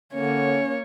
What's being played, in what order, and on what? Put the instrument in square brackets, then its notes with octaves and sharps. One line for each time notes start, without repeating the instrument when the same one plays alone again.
[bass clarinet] D3 [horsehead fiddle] A#3 C#5 [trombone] C#4